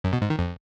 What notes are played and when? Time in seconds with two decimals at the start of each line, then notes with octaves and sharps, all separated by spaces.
0.04 F#2
0.13 B2
0.21 G#2
0.30 D#3
0.39 F2